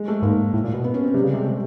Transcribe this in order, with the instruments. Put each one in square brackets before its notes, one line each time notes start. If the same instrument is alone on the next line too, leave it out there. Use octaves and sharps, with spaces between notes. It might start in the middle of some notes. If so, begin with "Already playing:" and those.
Already playing: [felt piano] G#3
A3
[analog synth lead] G#2 [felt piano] A#3
[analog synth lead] A2
A#2
B2
[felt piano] B3
C#4
C4
[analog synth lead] C3 [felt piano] G3
[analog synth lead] C#3
[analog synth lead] C3 [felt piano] G#3
[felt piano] A3